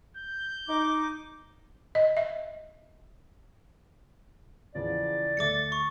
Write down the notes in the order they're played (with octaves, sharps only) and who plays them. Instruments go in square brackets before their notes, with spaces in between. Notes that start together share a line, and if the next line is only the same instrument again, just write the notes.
[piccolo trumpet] G6
[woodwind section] D#4 D6
[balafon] D#5
E5
[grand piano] E2 C#3 F3 [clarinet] D5
[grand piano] D2 A3 E5 [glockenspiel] D6 A6 C#7
[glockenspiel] C#6